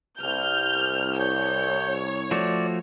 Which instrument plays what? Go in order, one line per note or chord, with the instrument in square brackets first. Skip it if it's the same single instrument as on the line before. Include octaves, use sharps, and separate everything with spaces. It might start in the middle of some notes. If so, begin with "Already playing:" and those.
[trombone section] C2 [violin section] F6 G6
[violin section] C#5 [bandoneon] G6
[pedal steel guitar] F3 A3 F#4 [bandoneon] D5